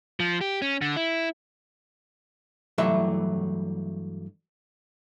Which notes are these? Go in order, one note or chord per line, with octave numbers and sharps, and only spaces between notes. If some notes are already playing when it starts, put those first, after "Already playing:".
F3
G4
C#4
D3
E4
G2 E3 F#3 A3 E4 E5